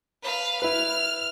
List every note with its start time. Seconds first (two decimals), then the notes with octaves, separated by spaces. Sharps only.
0.23 B4 F5
0.62 E4 B4 F6